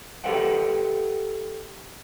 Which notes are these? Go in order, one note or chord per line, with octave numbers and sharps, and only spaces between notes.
G4 A4 B4 E5 F#5 G5